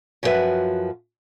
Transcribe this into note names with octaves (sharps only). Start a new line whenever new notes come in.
F#2 F3 E4 F#4 B4 E5